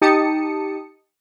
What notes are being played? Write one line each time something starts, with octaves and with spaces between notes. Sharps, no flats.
D#4 G4 A5 D#6 C#7